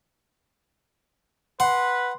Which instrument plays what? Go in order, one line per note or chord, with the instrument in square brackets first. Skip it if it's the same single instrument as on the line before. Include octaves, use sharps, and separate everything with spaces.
[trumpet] B4 [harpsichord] F#5 [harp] C6